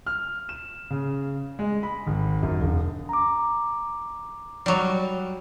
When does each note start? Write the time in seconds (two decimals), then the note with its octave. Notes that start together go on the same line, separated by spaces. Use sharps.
0.06 F6
0.49 E7
0.90 C#3
1.59 G#3
1.83 B5
2.07 G#1
2.43 F#2
2.60 E1
3.09 A#5 D6
4.66 F#3 G3